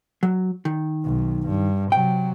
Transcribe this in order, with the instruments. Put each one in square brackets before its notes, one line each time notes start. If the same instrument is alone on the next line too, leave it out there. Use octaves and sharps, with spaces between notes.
[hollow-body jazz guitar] F#3
D#3
[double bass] B1
G2
[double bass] C3 F#3 [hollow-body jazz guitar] G5